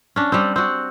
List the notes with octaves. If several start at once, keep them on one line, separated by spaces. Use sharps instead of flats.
C#4 D4
G3 C4
C4 F#4